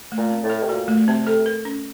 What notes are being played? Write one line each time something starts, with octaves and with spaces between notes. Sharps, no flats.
A3
A#2
C4
A2
A4
C3
A#2 F#4
A3
C3 C4
A4
A#4
C#4